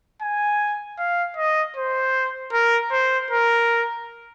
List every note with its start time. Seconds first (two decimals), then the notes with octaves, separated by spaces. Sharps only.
0.22 G#5
0.98 F5
1.37 D#5
1.76 C5
2.53 A#4
2.92 C5
3.31 A#4